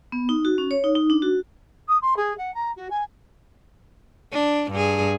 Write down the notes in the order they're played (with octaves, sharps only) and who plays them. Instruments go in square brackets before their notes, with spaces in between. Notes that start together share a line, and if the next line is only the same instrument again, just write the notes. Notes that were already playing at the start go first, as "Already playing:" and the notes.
[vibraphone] B3
D#4
F#4
C#4
C#5
D#4
D#4
D4
F#4
[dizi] D#6
C6
G#4
F#5
A#5
F#4
G#5
[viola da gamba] D4
G2 G#4